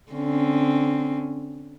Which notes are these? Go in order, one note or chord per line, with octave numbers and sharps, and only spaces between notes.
D3 C4 C#4